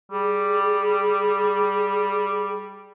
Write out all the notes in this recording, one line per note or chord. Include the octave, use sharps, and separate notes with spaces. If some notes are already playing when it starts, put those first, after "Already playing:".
G3 G#4